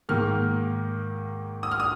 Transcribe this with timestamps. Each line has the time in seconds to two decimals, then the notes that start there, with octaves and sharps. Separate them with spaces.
0.09 G#2 D#3 A#3 F6
1.63 D#6
1.72 F6
1.80 D#6